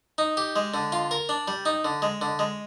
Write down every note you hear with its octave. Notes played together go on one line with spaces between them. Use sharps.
D#4
G4
G#3
D3
F4
A#4
D4
G3
D#4
D3
G#3
D3
G#3